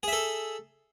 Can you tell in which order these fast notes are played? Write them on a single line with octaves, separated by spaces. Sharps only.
G#4 E5 A4